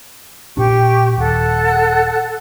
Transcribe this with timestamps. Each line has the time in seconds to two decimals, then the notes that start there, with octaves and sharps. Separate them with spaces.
0.57 A#2 D4 G4 C#6
1.18 D#1 A4 F#5